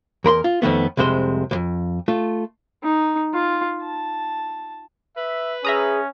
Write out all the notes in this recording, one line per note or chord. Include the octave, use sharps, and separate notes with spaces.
E2 A#4 B5 C6
F4
F2 D#3 A3 B3
C2 F2 C3 G#3 C5
C2 F2
A3 F4
D#4
F4
A5
B4 E5
C#4 G#4 E5 A#5 D#6